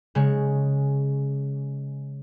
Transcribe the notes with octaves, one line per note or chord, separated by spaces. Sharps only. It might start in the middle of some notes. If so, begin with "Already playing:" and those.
C#3 G#3 C#5